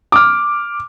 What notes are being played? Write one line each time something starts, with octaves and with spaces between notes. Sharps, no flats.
D6 F6